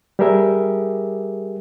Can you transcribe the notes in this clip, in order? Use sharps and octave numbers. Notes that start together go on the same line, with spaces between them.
G3 G4 G#4 A#4 E5